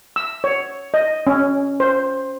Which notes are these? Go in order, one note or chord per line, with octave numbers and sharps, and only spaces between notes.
E6
C#5
D#5
C#4
C5